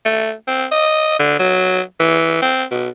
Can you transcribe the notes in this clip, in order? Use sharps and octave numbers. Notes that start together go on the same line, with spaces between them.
A3
C4
D#5
D3
F#3
E3
C4
B2